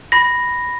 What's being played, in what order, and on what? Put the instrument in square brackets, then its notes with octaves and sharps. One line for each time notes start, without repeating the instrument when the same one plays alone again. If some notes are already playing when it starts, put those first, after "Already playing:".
[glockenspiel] B5 A#6